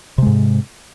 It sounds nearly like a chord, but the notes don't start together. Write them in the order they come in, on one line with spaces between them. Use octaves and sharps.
C3 G#3 G#2